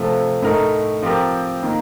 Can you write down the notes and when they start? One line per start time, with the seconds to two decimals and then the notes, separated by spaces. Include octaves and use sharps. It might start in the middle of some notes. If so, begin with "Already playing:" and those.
Already playing: C3 F3 A3
0.42 A2 A3 D#4 A#4
1.02 F3 C4 G4 A#4
1.63 D#3 A#3